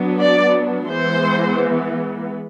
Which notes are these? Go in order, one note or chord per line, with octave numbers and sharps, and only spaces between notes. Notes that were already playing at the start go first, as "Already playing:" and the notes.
Already playing: F#3 B3 D4
D5
E3 G#3 B3 C5